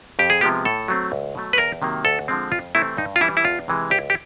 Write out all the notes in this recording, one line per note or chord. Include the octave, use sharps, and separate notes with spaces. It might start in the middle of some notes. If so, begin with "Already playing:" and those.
F2 G4
G#4
C3 F3 G#3 B3 G4
A2 A4
F#3 A3 C4
C#2
B2 F#3 A3
B4
E2 A#4
C3 D#3 F#3 A#3
D2 A4
D3 F3 G#3 C4
F2 F4
C3 E3 A3 C4 E4
G2 D#4
F4
E3 G3 E4
E4
E2 F4
C3 E3 G#3
C#2 G4
G4